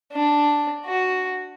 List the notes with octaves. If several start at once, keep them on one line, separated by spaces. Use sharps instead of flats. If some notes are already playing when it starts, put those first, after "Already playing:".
D4
F#4